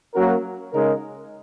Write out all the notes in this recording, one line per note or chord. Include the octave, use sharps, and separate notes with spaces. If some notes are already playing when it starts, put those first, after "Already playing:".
F#3 A#3 C#4 F#4 A#4
C#3 G#3 D#4 A#4